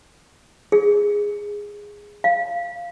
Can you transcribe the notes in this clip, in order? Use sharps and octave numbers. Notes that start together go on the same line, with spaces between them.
G#4
F5